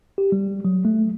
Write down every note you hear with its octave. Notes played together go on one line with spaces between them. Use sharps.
G4
G3
F#3
A3